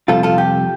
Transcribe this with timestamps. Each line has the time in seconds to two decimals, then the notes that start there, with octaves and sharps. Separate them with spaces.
0.08 F2 C3 G3 F4 A4
0.23 F4 A4
0.38 G4